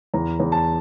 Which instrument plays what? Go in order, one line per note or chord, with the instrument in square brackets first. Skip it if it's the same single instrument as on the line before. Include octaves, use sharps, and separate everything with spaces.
[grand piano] E2 A#5
E2
A5